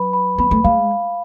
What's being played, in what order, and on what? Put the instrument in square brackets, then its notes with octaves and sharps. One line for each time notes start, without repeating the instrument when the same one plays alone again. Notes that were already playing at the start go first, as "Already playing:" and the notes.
Already playing: [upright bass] F#3 [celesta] B4 B5
[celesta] B5
[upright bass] B3 [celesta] B5
[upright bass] A3
[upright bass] G#3 [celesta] F5